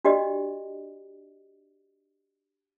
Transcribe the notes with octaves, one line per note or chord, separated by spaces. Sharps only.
D4 F#4 G4 D5 D#5